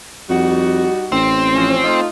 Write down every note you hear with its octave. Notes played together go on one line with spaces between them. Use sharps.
F2 G3 D#4 F#4
A1 C4
F3 C#4
A3 D#4 F4